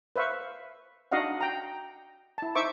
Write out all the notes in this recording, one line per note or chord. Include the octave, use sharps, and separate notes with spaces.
B4 C5 E5 F5 C#6
D4 D#4 F#4 D#5 F5 F#5
G5 A#5
E4 A5
D#4 C5 E5 C#6 D6